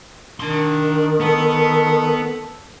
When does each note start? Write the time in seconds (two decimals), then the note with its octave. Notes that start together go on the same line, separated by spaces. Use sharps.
0.40 D#3 D4 C6
1.20 B3 A4